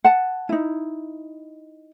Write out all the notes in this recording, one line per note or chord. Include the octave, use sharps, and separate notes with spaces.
F#5 A5
D#4 E4